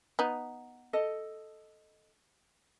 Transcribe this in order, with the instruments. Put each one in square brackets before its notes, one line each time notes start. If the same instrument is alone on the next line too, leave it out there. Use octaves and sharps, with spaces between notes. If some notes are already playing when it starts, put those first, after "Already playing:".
[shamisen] B3 D#4
[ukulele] A4 D#5